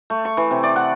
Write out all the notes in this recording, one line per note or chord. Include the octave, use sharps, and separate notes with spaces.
A3
C#6
E3
C3
D5
F#5